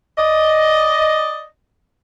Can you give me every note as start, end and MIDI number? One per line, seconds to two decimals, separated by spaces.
0.18 1.47 74
0.18 1.47 75